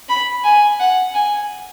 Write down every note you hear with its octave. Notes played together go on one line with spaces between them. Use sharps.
B5
G#5
F#5
G#5